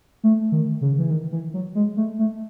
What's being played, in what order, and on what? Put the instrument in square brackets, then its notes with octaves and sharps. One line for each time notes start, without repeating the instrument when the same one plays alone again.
[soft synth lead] A3
D#3
C#3
E3
D#3
E3
F#3
G#3
A3
A3